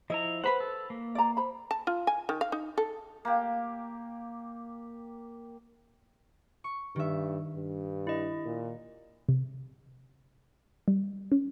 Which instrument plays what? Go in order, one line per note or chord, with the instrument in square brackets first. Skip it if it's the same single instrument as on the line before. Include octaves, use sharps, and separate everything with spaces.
[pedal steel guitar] F3 E4 A#5 [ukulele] D#5
[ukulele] B4 C5 [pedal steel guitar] F#5 B5
[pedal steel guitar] A4
A#3
[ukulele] D5 A#5
C5 B5
[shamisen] A5
F4
G#5
D#3
F5
D#4
A4
[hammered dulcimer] A#3 G4
[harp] C#6
[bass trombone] G2 [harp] D#3 E5
[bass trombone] G2
[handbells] E4 D#5
[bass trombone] A#2
[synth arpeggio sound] C3
G3
C#4